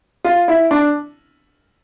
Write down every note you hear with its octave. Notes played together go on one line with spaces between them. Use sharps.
F4
E4
D4